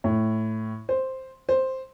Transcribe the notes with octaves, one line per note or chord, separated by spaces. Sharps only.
A2
C5
C5